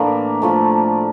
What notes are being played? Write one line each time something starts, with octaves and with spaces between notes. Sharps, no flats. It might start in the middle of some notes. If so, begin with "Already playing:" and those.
Already playing: A2 E3 A3 A#3 D4
A2 F3 A3